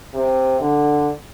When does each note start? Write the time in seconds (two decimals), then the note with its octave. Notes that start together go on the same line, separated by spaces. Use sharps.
0.14 C3
0.61 D3